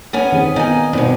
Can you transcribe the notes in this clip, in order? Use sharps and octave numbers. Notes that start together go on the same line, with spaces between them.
B3 C#4 G#5
D#3 C4 G#4
B3 D#4 F5 G#5
G2 B2 C4 D#4